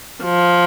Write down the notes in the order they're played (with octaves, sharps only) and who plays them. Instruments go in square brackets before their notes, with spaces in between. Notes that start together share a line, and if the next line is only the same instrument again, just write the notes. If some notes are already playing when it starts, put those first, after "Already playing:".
[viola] F3